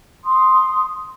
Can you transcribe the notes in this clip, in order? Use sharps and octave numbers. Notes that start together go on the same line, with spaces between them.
C6 D#6